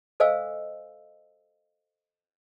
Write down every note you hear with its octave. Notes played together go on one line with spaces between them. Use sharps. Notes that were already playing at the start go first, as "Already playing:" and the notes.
A4 C5 D#5 F5 G#5 E6